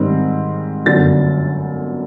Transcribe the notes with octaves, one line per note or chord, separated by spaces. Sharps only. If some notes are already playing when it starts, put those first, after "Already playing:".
Already playing: G#2 D#3 G3 C4
G1 F#2 D3 A6